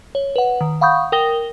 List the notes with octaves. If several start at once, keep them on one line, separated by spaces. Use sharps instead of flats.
C#5
B4 F#5
D#3
F5 F#5 B5 C#6 D#6 G6
A#4 G5 D#6 A#6 G7